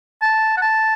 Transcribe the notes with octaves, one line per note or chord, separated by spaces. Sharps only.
A5
F#5
A5